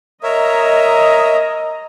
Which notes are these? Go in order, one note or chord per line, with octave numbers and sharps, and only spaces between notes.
A#4 C#5 D#5 E5 A#5